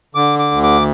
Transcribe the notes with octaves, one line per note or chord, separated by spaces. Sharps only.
D3 D6
D6
D2
D6